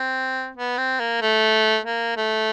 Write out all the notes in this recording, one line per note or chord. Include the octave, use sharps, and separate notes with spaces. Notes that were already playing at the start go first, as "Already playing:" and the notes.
Already playing: C4
B3
C4
A#3
A3
A#3
A3